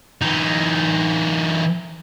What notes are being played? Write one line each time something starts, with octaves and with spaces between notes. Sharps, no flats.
E3 D#4